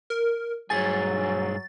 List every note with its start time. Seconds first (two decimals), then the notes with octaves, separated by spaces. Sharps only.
0.10 A#4
0.70 G2 F#3 G#4 G#5 A6